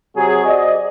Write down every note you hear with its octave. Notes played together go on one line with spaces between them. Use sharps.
C3 F#3 F#4 G#4
C5 D5 D#5